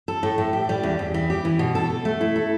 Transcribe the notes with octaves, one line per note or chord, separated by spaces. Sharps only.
A4
A2
A2
G4
G3
E2
E2
E3
G4
E3
B2
A4
A4
A3
E4
A4